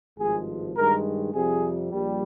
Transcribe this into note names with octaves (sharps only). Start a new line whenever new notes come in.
G#1 G2 F3 G#3 G#4
G2 D#3 G#3 A#4
F2 C3 G3 G#4
A#1 A#2 G3